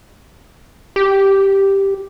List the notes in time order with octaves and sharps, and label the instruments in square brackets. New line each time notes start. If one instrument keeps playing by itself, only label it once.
[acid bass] G4